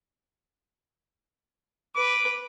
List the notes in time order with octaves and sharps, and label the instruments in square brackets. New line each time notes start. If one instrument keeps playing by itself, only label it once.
[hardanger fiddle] B4 [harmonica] D6